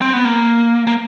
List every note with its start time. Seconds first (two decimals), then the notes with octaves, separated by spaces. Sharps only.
0.02 C4
0.13 B3
0.25 A#3
0.87 A#3